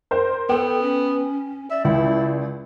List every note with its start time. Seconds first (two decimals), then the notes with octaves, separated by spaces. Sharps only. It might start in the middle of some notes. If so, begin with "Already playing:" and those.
0.11 A#4 C5
0.49 B3 A4 G5
0.82 C#4
1.71 D5 E5
1.85 C#2 E4